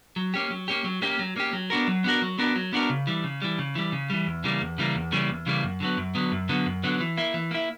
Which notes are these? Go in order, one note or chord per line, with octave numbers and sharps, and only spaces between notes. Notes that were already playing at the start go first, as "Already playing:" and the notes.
F#3
A#3 C#4 G4
F#3
A#3 C#4 G4
F#3
A#3 C#4 G4
F#3
A#3 C#4 G4
F#3
B3 D4 F#4 A#4
F#3
B3 D4 F#4 A#4
F#3
B3 D4 F#4 A#4
F#3
B3 D4 F#4 A#4
C#3
E3 G3
C#3
E3 G3
C#3
E3 G3
C#3
E3 G3
E2
C#3 E3 G3 A#3
E2
C#3 E3 G3 A#3
E2
C#3 E3 G3 A#3
E2
C#3 E3 G3 A#3
F#2
D3 F#3 B3
F#2
D3 F#3 B3
F#2
D3 F#3 B3
F#2
D3 F#3 B3
E3
A#3 E4
E3
A#3 E4